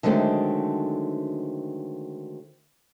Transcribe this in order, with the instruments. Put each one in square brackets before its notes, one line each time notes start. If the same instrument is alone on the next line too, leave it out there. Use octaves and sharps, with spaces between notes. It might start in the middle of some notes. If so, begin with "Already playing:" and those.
[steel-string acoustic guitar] D3 D#3 F#3 G#3 A3 C4